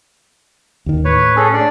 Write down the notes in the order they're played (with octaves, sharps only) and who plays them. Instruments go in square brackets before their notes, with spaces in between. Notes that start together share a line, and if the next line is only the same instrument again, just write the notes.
[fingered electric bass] D#2 D#3
[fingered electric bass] A2 [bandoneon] B4 C#5
[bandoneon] C#4 G#4 A4
D4 D5